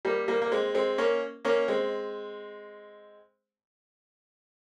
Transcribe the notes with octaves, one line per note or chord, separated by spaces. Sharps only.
G3 A#3
G3 A#3
A#3
G#3 C4
G#3 C4
A#3 C#4
A#3 C#4
G#3 C4